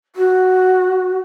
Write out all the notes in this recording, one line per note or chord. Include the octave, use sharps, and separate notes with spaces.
F#4